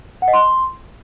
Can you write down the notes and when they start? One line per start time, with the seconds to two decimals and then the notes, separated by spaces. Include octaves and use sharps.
0.22 F#5
0.28 D#5
0.33 C6